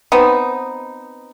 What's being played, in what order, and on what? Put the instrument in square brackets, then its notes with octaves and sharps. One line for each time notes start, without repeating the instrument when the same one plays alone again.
[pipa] B3 C4 D#4